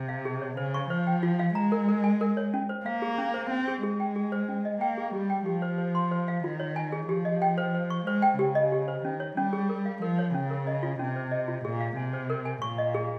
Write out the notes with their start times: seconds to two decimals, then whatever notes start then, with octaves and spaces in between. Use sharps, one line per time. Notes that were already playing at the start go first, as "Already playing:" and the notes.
Already playing: C3
0.09 F5
0.25 G#4
0.42 C#5
0.57 C#3 C5
0.74 C#6
0.90 F3 C5
1.07 G5
1.23 F4
1.39 F5
1.55 G#3 A#5
1.72 A#4
1.88 A#4
2.04 G#5
2.21 A#4
2.37 C#5
2.54 C#4
2.69 C5
2.86 A#3 F5
3.02 G#4
3.18 C#4
3.34 C5
3.51 C4 C#4
3.68 G#4
3.83 G#3 G#4
4.00 G5
4.16 G#4
4.32 C5
4.49 C#4
4.65 D#5
4.81 A#3 G5
4.98 G#4
5.13 G3 G4
5.30 G5
5.46 F3 G4
5.62 C5
5.78 C5
5.95 C6
6.11 C5
6.28 F5
6.44 D#3 F4
6.60 C#5
6.76 G#5
6.92 G#4
7.09 F3 G4
7.25 D#5
7.42 G5
7.58 C5
7.74 C5
7.90 C#6
8.07 G#3 C5
8.22 G5
8.39 C#3 G4
8.55 D#5
8.72 G4
8.88 C5
9.04 D#3 C#4
9.20 C#5
9.36 G3 C#4
9.53 G#4
9.69 A#4
9.85 F5
10.01 F3 A#4
10.19 C#5
10.34 C#3 C#4
10.50 A#4
10.67 D#5
10.83 F4
10.99 C3 C#4
11.16 C5
11.31 D#5
11.48 F4
11.65 A#2 G#4
11.81 F5
11.97 C3 G#5
12.13 C5
12.30 A#4
12.45 G#5
12.62 A#2 C#6
12.78 D#5
12.94 G#4